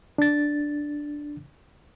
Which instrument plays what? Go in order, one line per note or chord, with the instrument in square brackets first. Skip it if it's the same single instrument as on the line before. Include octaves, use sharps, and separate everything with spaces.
[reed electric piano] D4 A6